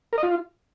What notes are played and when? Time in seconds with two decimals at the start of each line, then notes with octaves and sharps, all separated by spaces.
0.13 A#4
0.18 D#5
0.23 F4